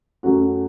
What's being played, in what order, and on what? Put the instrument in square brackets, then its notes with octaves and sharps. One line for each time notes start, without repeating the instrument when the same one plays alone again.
[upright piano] F#2 F#3 A3 C#4 F#4